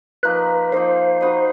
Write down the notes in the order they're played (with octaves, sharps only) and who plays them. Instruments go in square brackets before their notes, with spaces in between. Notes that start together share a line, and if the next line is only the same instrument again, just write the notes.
[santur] F3 A#3 D#4 [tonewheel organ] B4
[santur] F3 A#3 D#4 [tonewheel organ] C5
[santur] D#4 F#4 B4 D#5